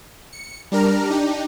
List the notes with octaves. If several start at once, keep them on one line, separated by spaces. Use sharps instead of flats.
C#7
G3 D4 A#4 A#5 F6
D4 D#4 G4